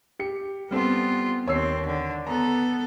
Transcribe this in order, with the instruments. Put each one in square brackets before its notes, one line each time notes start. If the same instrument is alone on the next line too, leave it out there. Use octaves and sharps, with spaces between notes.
[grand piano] G4 C#7
[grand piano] G3 C4 A4 [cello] B3 F4
[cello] D#2 C4 [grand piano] C#5 E6 C7
[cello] D3
[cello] B3 A4 [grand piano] A#5